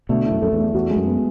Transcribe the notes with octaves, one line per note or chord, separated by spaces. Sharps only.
B2 D3 A3
E4
F#2
F#2 A4
E2
A3
E2 F#4
G#3
F#2
B3